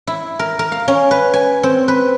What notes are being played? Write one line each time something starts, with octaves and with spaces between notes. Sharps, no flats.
E4
A#4
A#4
F5
C#4
B4
G#5
C4
B4